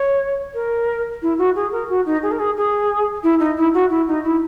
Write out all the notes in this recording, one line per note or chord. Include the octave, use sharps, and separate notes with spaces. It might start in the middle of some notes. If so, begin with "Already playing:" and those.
Already playing: C#5
A#4
E4
F#4
G#4
A#4
F#4
D#4
G#4
A#4
G#4
G#4
E4
D#4
E4
F#4
E4
D#4
E4